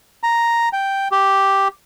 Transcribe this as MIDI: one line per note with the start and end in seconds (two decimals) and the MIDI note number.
0.23 0.69 82
0.73 1.08 79
1.12 1.68 67